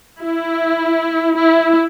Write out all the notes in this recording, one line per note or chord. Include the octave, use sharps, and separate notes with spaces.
E4
E4